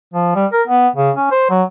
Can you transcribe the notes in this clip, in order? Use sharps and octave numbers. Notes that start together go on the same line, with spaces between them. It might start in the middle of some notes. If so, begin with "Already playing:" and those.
F3
G3
A#4
B3
C#3
C#4
C5
F#3